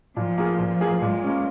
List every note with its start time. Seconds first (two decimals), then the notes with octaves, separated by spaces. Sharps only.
0.16 A#2 F3
0.38 A#3 F4 G#4
0.59 A#2
0.81 A#3 F4 G#4
1.01 A#2 G#3
1.22 A#3 C#4